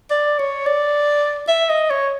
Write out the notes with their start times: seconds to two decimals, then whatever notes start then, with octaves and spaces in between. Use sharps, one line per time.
0.11 D5
0.39 C#5
0.66 D5
1.48 E5
1.69 D#5
1.91 C#5